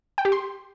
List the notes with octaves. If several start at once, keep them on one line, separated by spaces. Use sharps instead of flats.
G5
G4
C6